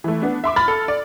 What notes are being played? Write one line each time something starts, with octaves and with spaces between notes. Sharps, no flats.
E3 A3
B3 D4
E5 C6 D6
B5 F6 A6
A4
D5